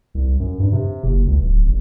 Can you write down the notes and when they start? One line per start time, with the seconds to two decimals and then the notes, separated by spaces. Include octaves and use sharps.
0.15 C2
0.40 F#2
0.60 G2
0.73 C3
1.03 F#1
1.27 C#2
1.42 D1
1.65 G1